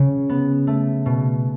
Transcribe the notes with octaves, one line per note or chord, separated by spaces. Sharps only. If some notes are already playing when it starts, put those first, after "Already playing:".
Already playing: C#3
B3
A3
B2